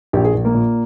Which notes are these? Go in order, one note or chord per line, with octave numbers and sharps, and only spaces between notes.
A#1 G4
G#4
A#1
A#3
A#2